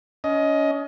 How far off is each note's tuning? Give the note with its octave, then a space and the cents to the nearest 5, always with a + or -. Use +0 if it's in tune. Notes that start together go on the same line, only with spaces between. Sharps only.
C#4 +35 D#5 +15